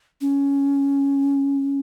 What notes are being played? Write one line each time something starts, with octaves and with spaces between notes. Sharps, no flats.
C#4